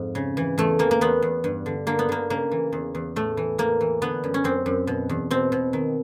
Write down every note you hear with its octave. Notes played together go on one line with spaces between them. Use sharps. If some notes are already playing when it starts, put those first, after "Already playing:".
Already playing: F2 G#2
C#3
E3
E2 A3
E3 A#3
A#3
E2 B3
E2
G2
D3
D3 A#3
B3
D3 A#3
C#3 A#3
E3
E2
E2
A2 A3
E3
A2 A#3
E3
D3 B3
F#2
C#4
F#2 C4
F#2
B2
E2
B2 C4
B2
D#3